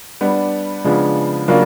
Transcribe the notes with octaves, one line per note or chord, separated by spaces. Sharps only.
G3 B3 D4
C#3 F3 G#3 B3 D4
C#3 F#3 A#3 D4 F4